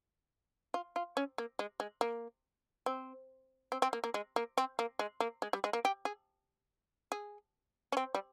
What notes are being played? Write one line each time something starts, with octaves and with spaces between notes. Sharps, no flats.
F4
F4
C#4
A#3
G#3
G#3
A#3
C4
C4
C4
A#3
A#3
G#3
A#3
C4
A#3
G#3
A#3
G#3
G3
G#3
A#3
G4
G#4
G#4
C#4
C4
G3